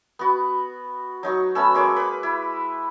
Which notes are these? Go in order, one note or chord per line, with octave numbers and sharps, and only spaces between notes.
B3 F#4
F#3 D#4 A#5 C#6
A3 B3 C#4 E6
G#3 A#3 C#5 D6
B4 D6
E4